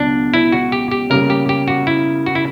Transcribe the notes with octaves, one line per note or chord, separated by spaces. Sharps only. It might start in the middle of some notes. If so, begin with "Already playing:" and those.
Already playing: C#2 B2 F#3 D4
E4
F#4
G4
G4
C#3 G3 A#3 A#4
G4
G4
F#4
E4
F#4
E4